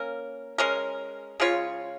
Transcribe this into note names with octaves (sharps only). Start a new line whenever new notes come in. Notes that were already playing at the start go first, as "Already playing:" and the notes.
Already playing: A#3 C#4 A#4
G#3 C#4 A#4
C#3 G#3 F4 C#5